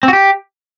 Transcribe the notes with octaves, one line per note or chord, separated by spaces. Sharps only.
C4
F#4
G4